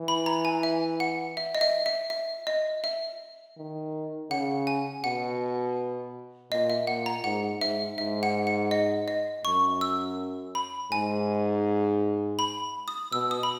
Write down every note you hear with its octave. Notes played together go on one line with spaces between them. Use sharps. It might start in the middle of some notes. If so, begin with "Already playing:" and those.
Already playing: E3
B5
A#5
G#5
E5
F#5
E5
D#5
E5
E5
E5
D#5
E5
D#3
C#3 F#5
G#5
B2 F#5
A#2 D#5
E5
A#2 F#5
A#5
G#2 F#5
G#2 E5
G#2 E5
F#5
F#5
D#5
D#5
F#2 C#6
E6
B5
G#2 G#5
B5
D#6
B2 E6
D#6
B5